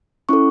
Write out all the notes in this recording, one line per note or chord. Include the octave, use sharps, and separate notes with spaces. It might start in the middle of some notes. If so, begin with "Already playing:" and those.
C#4 E4 A4 C#6